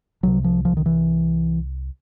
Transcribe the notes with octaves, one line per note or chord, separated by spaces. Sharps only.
C2 C3 F#3
F3
F3
D#3
E3